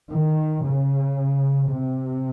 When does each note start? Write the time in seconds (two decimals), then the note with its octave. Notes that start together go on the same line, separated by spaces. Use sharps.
0.11 D#3
0.64 C#3
1.70 C3